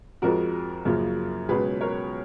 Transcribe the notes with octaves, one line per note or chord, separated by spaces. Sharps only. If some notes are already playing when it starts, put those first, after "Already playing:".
F2 F3 G#3 F#4 A#4
F#2 C#3 F3 A#3
C#2 B2 F#3 C#4 G#4 B4
A#4 C#5